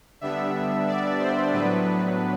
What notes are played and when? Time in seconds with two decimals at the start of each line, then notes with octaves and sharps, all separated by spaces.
0.21 D3 G3 B3 D4 E5
0.87 D5
1.20 C5
1.52 A2 F#3 B3 D4 B4